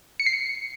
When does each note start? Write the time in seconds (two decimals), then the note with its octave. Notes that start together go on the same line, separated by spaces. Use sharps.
0.20 C#7
0.26 C7
0.33 C#7